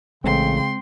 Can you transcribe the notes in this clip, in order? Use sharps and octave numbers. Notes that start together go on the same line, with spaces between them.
A1 C#3 G#3 C4 G5 C6